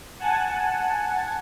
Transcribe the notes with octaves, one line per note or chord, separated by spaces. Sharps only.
F#5 G#5 A5